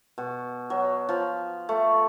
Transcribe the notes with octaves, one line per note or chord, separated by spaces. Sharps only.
B2
F#3
F3
A3